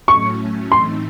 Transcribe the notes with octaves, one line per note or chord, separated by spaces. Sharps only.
A2 F#3 A3 C#4 C#6
A2 E3 A3 C4 D#4 C6